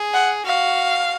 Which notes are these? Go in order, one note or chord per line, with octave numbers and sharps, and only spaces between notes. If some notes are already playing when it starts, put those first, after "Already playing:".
Already playing: G#4
F#5
F#4 F5